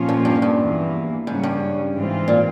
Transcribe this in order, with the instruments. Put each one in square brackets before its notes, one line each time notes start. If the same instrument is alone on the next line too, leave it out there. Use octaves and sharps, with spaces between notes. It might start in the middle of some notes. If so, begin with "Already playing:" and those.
Already playing: [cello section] A#2 F3 A#3 C#4 F4
[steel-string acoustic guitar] F2
G2
G2
[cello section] E2 E3 A#3
[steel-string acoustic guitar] G#2 [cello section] C#3 G3 C#4
[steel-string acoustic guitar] G2
[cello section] G#2 E3 G#3 C4 F4
[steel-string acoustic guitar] A#2